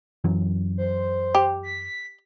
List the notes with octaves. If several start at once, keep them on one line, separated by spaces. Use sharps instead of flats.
F#2 E3 F#3
C5
G4
B6